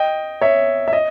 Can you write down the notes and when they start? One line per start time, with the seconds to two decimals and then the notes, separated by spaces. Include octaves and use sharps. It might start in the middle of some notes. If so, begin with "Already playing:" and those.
Already playing: D#5 G5
0.41 C#5 E5
0.88 E5
0.93 D#5